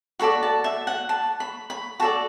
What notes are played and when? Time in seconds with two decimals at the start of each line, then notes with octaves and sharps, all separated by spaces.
0.19 F#4 A4 D5 B5
0.43 A5
0.64 E5
0.87 F#5
1.09 A5
1.40 B5
1.70 B5
2.00 F#4 A4 D5 A5